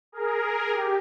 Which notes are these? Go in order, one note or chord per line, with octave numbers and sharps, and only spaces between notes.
G#4 A#4
G#4
G4